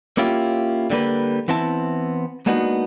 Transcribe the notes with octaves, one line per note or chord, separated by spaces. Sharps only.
A#3 C#4 E4 F4 G4
D3 G3 A#3 B4
E3 B3 C4 E4 A5
G#3 A#3 B3 D4 D#4 F#4